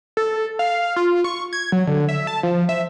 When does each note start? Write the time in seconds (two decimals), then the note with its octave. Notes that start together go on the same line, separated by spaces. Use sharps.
0.17 A4
0.59 F5
0.96 F4
1.24 C#6
1.53 G#6
1.72 F#3
1.87 D3
2.09 E5
2.27 A5
2.43 F3
2.69 E5